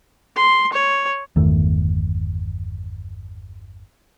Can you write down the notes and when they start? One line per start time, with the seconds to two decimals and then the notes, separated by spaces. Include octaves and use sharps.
0.36 C6
0.73 C#5
1.36 G1 E2 D#3 A3